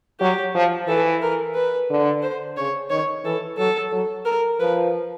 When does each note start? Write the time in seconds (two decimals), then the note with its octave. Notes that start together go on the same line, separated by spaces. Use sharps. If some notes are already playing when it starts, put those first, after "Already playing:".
0.20 F#3 G4
0.54 F3
0.88 E3 A4
1.22 A#4
1.55 B4
1.90 D3
2.23 C5
2.57 C#3 C#5
2.90 D#3 C#5
3.24 E3 A4
3.58 F#3 A4
3.92 F#3
4.25 A#4
4.60 F3 B4